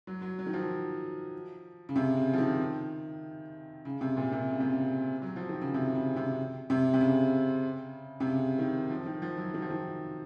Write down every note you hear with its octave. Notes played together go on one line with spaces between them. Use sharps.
F#3
F#3
F#3
D#3
F3
C#3
C3
C#3
F3
D#3
C#3
C3
A#2
C3
C#3
C3
C#3
F#3
F3
D#3
C#3
C3
C#3
C3
C3
C3
C#3
C3
C#3
D#3
F3
D#3
F3
F#3
D#3
F3
D#3